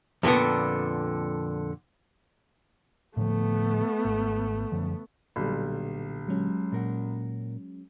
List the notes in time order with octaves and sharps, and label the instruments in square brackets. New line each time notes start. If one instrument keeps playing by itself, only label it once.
[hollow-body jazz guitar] F2 A#2 D3 B3
[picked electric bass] A2 D3 F3 [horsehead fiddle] A3 B3
[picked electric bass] G#1
F#2 D3 F3
[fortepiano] B1 G3 [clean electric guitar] A#2 D3
[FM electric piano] F#3 G#3 C#4
[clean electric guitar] A#2 A#4 F#5